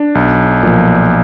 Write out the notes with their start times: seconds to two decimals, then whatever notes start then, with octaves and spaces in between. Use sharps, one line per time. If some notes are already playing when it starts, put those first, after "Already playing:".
Already playing: D4
0.15 B1
0.63 A#2 F3